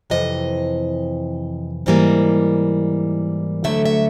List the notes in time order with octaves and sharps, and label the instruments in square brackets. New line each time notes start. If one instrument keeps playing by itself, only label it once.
[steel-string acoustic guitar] F2 C3 E3 D#5
G#2 E3 G3 A#3 D#5
D2 D3 F#3 A3 E5
E5